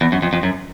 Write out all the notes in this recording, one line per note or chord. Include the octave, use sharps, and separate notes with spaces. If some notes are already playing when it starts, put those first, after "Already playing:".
E2
F#2
F2
F2
F#2